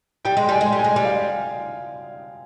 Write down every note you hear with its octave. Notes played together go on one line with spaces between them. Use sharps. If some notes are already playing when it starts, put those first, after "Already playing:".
G3 G5
G#3
G3 G#5
G#3
G3
G#5
G#3
G3
F5